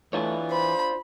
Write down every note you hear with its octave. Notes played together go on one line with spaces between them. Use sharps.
E3 A3 D4 F4 C#5
C5 B5